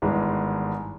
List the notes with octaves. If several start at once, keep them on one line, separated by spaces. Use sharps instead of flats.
G#1 G2 E3 G#3 B3